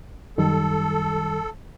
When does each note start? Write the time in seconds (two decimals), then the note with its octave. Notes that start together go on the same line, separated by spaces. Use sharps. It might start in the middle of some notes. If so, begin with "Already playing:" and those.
0.38 F#2 D#3 G3 A4